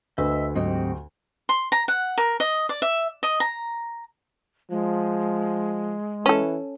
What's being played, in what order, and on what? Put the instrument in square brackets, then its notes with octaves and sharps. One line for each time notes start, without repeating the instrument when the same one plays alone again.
[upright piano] D2 [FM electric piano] B4 [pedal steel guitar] D#5 E5 E6
[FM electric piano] G#2 F#3 D#5 [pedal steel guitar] C4 F#4 G4
[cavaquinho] C6
A#5
F#5
A#4
D#5
D5
E5
D#5
A#5
[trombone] F3 [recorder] G#3
[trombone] E3 [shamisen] C#4 A4